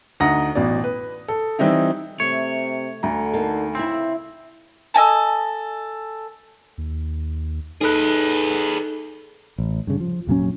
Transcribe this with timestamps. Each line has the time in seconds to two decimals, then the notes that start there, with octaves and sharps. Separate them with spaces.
0.20 D2 D#4 F#5 A#5 D#6 A#6
0.55 A1 B2 D5
0.84 B4
1.28 A4
1.59 E3 G3 C4 D#4 E4
2.20 C3 A3 C#5
3.03 D2 D3 A#5
3.34 A#3 D#4 A4
3.75 C#3 C4 E4
4.94 A4 D#5 G#5 A5
6.78 D#2
7.81 D#4 G#4 A4 B4 F#6
9.58 A1
9.87 G2 C#3
10.00 F3
10.27 F1 A#2 F#3 C#4